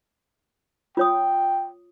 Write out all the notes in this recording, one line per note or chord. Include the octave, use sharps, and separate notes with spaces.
F4 C#5 G5 D#6